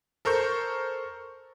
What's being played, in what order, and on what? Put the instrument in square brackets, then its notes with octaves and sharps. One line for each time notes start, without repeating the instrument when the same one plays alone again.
[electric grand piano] A4 A#4 C5 C#6 G6